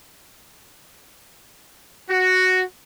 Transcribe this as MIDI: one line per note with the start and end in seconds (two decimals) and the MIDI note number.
2.10 2.63 66